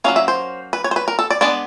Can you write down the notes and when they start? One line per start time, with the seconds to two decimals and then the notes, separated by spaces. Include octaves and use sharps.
0.04 F#3 A#3 C#4 F5
0.16 E5
0.28 C5
0.73 B4
0.84 C#5
0.91 C5
0.96 B4
1.08 A#4
1.19 A4
1.30 D5
1.41 G#3 B3 D4 D5